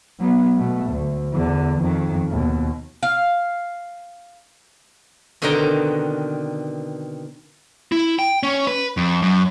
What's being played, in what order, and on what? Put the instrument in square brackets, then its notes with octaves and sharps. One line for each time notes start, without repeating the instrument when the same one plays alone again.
[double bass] F#3 B3
B2 A3
D2
E2 D3
F2 D#3
D#2 B2
[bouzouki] F5
[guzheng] B2 D3 D#3 C4 G5 A#5
[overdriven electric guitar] E4
G5
C#4
B4
F2
F#2